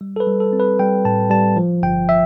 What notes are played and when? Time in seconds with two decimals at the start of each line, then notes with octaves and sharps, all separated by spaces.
0.01 G3
0.16 A4
0.20 B4
0.27 G3
0.40 A4
0.53 C4
0.60 B4
0.79 G3 G5
1.05 A2 A5
1.30 G3 A5
1.57 F3
1.83 G1 G5
2.09 E5